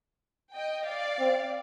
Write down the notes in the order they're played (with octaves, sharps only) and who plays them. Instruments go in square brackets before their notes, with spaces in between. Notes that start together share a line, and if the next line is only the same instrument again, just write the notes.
[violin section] D#5 G5
D5 F5
[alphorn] C4